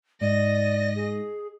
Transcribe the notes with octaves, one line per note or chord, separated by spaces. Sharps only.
G#2 D5 D#5 A#6
G#4